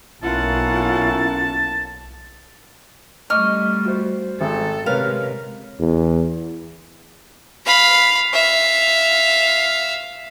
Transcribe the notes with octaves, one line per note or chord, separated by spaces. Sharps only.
B1 A#3 C#4 E4 F4 F#5 A5
G3 A3 D#5 C#6 D6 F6
F#4 C5
G#1 A4
C3 G#3 A#4 B4 C#5 F5
E2
F5 B5
E5 F5